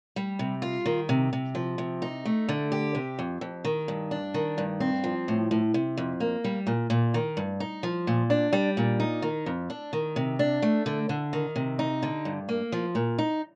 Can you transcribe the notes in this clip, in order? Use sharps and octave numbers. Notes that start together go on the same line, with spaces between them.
G3
C3
F4
D#3
C3
C3
F3
C3
D#4
A3
D3
G4
C3
F2
F2
D#3
G2
D4
D#3
G2
C4
F3
A2
A2
C3
F2
A#3
G3
A#2
A#2
D#3
G2
D#4
F3
A#2
D4
G3
A#2
D#4
D#3
F2
D4
D#3
C3
D4
A3
D3
D3
D#3
C3
D#4
D3
G2
A#3
F3
A#2
D#4